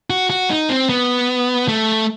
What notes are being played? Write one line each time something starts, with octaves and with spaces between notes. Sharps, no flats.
F#4
F#4
D#4
C4
B3
A3